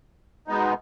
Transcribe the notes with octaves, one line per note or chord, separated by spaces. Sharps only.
B2 G#3 B3 D#4